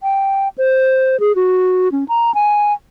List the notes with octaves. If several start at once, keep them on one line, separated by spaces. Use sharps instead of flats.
G5
C5
G#4
F#4
C#4
A#5
G#5